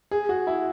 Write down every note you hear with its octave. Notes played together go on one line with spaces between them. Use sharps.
G#4
F#4
E4